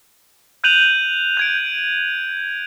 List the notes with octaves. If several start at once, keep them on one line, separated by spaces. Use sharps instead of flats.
F#6 G6 D#7 F7 F#7
G6 G#6 D7